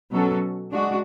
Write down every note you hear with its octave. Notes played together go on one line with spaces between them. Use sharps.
B2 F#3 C#4 F#4 A4
G#3 D4 F#4